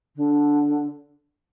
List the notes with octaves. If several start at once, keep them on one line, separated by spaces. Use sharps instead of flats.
D3